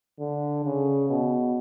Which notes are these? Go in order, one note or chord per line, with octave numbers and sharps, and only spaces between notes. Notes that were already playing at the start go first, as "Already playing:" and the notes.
D3
C#3
B2